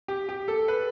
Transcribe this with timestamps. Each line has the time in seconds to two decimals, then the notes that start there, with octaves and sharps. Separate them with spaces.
0.08 G4
0.29 G4
0.48 A4
0.68 B4